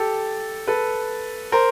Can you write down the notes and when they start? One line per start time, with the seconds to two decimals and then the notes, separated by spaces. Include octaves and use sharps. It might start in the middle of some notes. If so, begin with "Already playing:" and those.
Already playing: G4 A4
0.67 A4 B4
1.52 A#4 C5